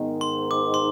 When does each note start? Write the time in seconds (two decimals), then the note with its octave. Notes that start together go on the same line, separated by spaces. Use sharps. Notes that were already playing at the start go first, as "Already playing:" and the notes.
Already playing: G#2 D#3 B3
0.21 C6
0.51 D6
0.74 C6